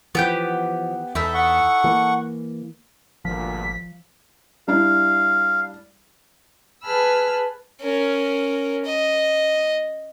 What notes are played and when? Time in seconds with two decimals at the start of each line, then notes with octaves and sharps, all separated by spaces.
0.15 E3 F3 B3 G4 G6
1.15 E2 D#4 E4 A4 E5
1.34 F#5 C#6
1.84 E3 A#3
3.25 G#1 D2 G2 A#2 F3 B6
4.68 G3 D4 E4 F5
6.83 G#4 B4 A5 B5 E6 F6
7.82 C#4 A#4
8.85 D#5